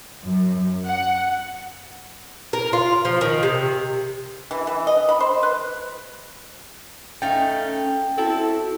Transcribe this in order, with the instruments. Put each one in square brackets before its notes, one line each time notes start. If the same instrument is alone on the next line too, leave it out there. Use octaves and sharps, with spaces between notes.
[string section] F#2
F#5
[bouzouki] A#4
F4
F3
D#3
C3
[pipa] E3
E3
D#5
B5
C5
B4
[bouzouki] A3 D#4 F5 [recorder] C#4 [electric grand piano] G5
[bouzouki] C4 E4 A5 [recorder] F#4 [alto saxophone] A4